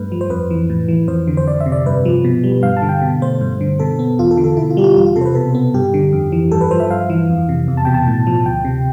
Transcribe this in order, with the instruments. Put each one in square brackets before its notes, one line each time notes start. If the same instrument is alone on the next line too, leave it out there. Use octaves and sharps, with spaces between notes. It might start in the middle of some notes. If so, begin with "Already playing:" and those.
Already playing: [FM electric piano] G2 A3 B4
F3
C5
F2 B4
E3
A2
E3
F2 C5
D3
C5
F2 D5
E5
C3
D5
G2 B4
F3
B2
G3
G2 F5
A5
D3
G5
B2
A3 C5
G2
D3
B2 A4
B3
E2 F4
A4
D3
A4
B2 E4
F4
G3 G4
F4
E2 F4
F4
C3 A4
C5
B4
B2 A4
B3
G2 G4
D3
F2
E3
G2 A4
B4
F3 C5
E5
G2 F5
E3
F2
C3
E2
A5
B2 G5
A5
A2
F3
D2 G5
C3